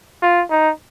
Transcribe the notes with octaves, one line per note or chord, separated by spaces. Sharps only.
F4
D#4